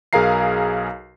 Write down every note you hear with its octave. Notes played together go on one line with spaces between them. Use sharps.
B1 G#4 A#4 F5 A#5 C7